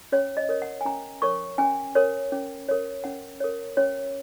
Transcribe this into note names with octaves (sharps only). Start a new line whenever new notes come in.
C#4 C#5
D#5
A#4 C#5
F#5
G#5
C#4 A#5
A#4 C#5 C#6
C#4 G#5
A#4 C#5
C#4
A#4 C#5
C#4 F#5
A#4 C#5
C#4 C#5